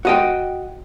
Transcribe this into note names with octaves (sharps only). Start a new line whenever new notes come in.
F#4 D#5 G5